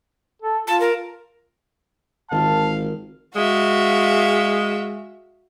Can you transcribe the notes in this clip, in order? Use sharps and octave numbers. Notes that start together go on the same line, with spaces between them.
A4
F4 A5
A#4
G#1 D#3 F4 F5 A5
G#3 F#4 E5 F5